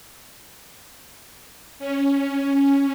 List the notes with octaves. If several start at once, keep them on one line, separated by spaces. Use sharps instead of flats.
C#4